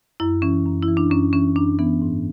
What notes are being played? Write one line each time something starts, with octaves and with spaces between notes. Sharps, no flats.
F#2 E4
E3 C#4
F#2
E4
E3
D4
F#2 C#4
E3 C#4
F#2 D4
E3 B3
G#2